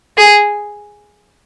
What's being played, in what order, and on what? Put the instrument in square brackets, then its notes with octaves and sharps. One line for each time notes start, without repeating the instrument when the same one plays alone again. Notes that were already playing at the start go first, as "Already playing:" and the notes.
[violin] G#4